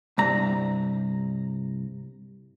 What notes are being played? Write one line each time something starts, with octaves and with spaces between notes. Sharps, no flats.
C2 G2 A#5